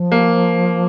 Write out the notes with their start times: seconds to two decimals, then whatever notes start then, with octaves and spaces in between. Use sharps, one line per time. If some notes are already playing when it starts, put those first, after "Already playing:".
Already playing: F3
0.12 A#3